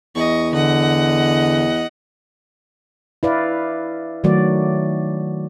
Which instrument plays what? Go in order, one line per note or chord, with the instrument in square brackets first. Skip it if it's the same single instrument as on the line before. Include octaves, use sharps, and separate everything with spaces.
[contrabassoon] E2 [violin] D#5 C#6
[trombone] D3 [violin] D#5 F#5
[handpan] E4 B4 D5 F5
D#3 F#3 A3 F#4 D5